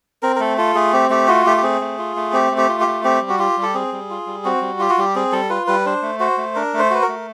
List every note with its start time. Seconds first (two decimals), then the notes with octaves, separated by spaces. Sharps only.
0.23 C4 A#4
0.36 A#4
0.40 A3 A4
0.58 F4 A4
0.75 A3 G#4
0.93 C4 G4
1.10 A3 G4
1.28 F4 F#4
1.46 A3 G4
1.57 G4
1.63 C4 G#4
1.81 A3
1.98 F4
2.16 A3
2.33 C4 G4
2.52 A3
2.58 G4
2.69 F4
2.81 G4
2.87 A3
3.04 C4 G4
3.22 G3
3.29 F#4
3.39 F4 G4
3.57 G3
3.62 A4
3.74 C4 G#4
3.93 G3
4.10 F4
4.26 G3
4.45 C4 F#4
4.62 G3
4.79 F4 G4
4.90 F#4
4.98 G3 G4
5.15 C4 G#4
5.32 G3 A4
5.50 F4 B4
5.67 G3 B4
5.86 D4 C5
6.02 A3
6.20 F#4 C5
6.38 A3
6.55 D4 A#4
6.74 A3
6.79 C5
6.90 F#4 B4
7.02 A#4
7.08 A3